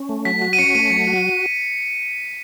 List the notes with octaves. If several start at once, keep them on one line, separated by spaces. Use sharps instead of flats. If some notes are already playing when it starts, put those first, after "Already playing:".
Already playing: C#4
A3
F#3 B6
F#4
D#7
C#4 C#7
A3 D#7
F#3 C#7
F#4